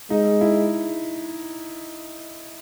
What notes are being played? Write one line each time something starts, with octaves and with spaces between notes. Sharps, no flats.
G#3 D#4
E4